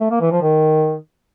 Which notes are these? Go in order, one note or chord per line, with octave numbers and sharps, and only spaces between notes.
A3
A#3
E3
F3
D#3